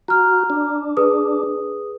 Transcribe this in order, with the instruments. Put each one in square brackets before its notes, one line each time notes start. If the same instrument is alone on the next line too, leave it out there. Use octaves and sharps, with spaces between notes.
[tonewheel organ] F#4 [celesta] A#5 F6
[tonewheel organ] D4
[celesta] G#4 B4 D#6